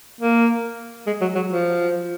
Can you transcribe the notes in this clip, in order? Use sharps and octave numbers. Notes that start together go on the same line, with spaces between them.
A#3
G#3
F#3
F#3
F3